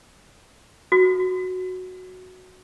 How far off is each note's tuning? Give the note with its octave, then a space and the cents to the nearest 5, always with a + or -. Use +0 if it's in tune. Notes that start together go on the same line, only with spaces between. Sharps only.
F#4 -5